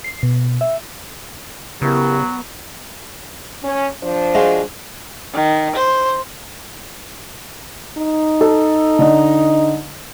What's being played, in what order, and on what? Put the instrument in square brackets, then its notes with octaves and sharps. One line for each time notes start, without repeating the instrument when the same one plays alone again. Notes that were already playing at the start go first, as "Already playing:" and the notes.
[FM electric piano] C7
B2
E5
[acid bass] C#3 [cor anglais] F#3 [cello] B3 [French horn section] E4 G4 A#4
[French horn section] C#4
F3 D4 C5
[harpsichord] G#3 F4 F#4
[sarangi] D#3
C5
[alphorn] D#4
[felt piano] A4
D3 D#5